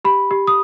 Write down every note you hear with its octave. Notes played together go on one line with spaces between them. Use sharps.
G4 B5
G4
D#6